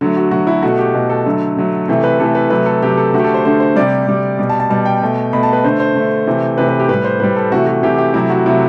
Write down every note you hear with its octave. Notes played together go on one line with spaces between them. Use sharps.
D3 F#3 A3
F#4
D3 F#3 A3 F#4
E4
B2 A3 F#4
G4
B2 A3
A4
D3 F#3 A3
D3 F#3 A3
C3 E3 A3
B4
C3 E3 A3 A4
B4
C3 F#3 A3 B4
A4
C3 F#3 A3 G4
A4
D3 A3 F#4
G4
A4
C5
D3 A3 C5
C5
C3 G3 D5
C3 G3
B2 G3
A5
A5
B2 G3 A5
G5
B2 A3
B2 A3 B5
A5
B4
D3 A3 C5
C5
D3 A3
C3 E3 A3
C3 E3 A3 B4
B4
G4
A2 G3 B4
C5
A2 G3 B4
A4
C3 E3 A3 F#4
F#4
C3 E3 A3 G4
G4
C3 F#3 A3 E4
F#4
C3 F#3 A3 E4